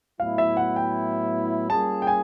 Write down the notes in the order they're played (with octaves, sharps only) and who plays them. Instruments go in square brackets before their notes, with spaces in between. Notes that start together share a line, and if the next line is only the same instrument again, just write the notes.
[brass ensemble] A2 F#3 B3 E4 [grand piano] F5
[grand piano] E5
F#5
G5
[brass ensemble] G3 A#3 C#4 F4 G#4 [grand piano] A5
[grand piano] G5
G#5